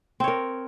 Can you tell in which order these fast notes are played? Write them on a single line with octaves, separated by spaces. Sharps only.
C4 C#5 A#4